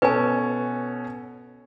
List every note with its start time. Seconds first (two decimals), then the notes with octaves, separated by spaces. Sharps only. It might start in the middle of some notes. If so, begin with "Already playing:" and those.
0.02 B2 C#4 A4 B4 G#5